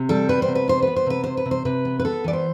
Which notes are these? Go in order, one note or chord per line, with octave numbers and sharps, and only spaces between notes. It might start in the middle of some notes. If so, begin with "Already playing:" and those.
Already playing: C3
G3 A4
B3 B4
C5
C3
B4
B3 C5
B3 B4
C5
C3 B4
C3 C5
B4
C3
C5
C3 B4
B3
B4
B3 A4
E3 D5
C5